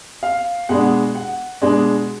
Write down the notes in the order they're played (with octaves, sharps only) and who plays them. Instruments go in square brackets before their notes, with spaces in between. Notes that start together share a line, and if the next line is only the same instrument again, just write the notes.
[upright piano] F5
B2 G#3 D4 F#5
F#5
B2 G#3 D4